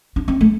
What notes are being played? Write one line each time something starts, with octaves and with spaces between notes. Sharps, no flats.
D4
C4
A3